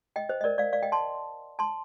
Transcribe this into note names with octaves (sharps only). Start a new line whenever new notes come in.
D#5 G5
C5 D#5
D#5
A#4 D5
D5 F5
D5 F5
D#5 G5
A5 C6
A5 C6